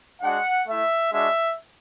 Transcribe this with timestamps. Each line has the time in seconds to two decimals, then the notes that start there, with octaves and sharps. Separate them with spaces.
0.22 G#3 D4 F#4 F#5
0.66 A3 E4 E5
1.12 G#3 D4 F#4 E5